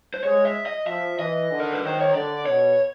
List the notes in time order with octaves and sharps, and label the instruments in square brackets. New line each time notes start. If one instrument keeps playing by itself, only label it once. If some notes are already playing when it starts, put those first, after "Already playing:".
[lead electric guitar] C5
[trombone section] G#3 [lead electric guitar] C#5
[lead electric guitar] E5
D#5
[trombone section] F3 [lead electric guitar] E5
[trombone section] E3 [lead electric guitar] D#5
[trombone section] D3
[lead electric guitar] A#4
B4
[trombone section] D#3 [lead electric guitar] C5
[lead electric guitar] C#5
[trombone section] D3 [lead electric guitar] D5
[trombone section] B2 [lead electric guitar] C#5